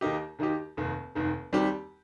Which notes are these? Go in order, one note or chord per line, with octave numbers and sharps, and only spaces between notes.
D#2 D#3 A#3 D#4 G4
D#2 D#3 A#3 D#4 G4
F1 D#2 D#3
F1 D#2 D#3
D#2 D#3 G3 C4 G4